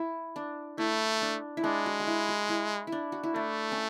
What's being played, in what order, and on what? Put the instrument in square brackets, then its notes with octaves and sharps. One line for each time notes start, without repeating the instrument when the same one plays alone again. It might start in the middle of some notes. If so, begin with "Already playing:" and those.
Already playing: [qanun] E4
D4
[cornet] A3 [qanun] E4
[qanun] D4
E4
[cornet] G#3 [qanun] D4
[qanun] F#4
F#4
E4
F#4
E4
E4
D4
F#4
E4
[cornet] A3 [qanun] D4
[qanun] C#4